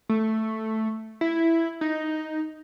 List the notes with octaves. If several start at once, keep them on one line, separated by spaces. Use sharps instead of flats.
A3
E4
D#4